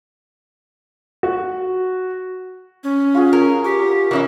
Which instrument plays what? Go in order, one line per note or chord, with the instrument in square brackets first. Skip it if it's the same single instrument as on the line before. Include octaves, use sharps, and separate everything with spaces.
[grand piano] F#4
[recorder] C#4
[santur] F4 F#4 G#4
[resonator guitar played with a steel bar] A#4
[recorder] G4 [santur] C#5
[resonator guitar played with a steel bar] E3 C#4 E4 [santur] A#4 D#5 D#6